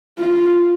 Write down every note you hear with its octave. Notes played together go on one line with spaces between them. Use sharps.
F4